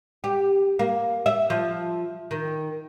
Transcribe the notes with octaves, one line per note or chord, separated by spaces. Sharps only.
G4
A#3
E5
F3
D#3